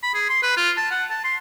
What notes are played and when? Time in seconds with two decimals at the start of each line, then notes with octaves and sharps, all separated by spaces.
0.03 B5
0.15 G#4
0.30 C6
0.43 B4
0.57 F4
0.77 A5
0.92 F#5
1.10 A5
1.25 C6